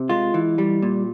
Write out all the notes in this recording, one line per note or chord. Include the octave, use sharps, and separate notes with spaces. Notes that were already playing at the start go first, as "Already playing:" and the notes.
Already playing: C3
G#3 F4
E3
G3
A#2